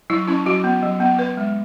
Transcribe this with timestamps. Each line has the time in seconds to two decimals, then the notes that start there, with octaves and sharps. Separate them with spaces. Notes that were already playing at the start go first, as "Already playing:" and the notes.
0.10 F#3 E4
0.28 C#4 E4
0.46 F#3 F#4
0.64 B3
0.83 F#3
1.00 B3
1.18 B3 B4
1.37 G#3